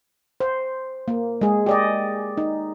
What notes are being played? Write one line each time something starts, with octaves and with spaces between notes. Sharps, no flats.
C5
A#3
G#3 G#4
G4 D5 D#5
D#4